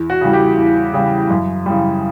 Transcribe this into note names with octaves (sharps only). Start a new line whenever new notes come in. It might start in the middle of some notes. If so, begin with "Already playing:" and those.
Already playing: E2
F#4
C#3 E3 G3
G4
E2
C#3 E3 G3
F#2
C#3 E3 G3